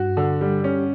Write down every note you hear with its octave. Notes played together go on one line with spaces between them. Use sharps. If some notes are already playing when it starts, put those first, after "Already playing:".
Already playing: G2 F#4
D3
G3
C#4